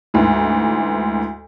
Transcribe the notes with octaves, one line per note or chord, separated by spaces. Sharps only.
D2 G#2 E3